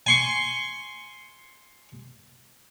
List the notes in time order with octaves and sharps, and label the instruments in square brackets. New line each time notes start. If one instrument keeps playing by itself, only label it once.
[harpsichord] G#5 C6 C#6